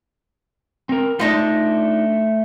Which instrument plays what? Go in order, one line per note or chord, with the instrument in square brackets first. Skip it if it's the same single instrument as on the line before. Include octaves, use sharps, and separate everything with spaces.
[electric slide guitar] C4 A#4
[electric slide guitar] A3 C5 D#5 [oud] D4 D#4 F4